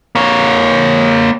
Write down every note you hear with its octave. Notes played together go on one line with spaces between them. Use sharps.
A#3 C#5